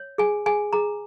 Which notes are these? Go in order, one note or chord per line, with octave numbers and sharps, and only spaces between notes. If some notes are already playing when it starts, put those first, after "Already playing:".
Already playing: C#5
G#4 G#5
G#4 G#5
G#4 A#5